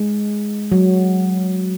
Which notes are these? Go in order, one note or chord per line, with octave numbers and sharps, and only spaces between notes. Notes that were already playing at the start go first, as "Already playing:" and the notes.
Already playing: G#3
F#3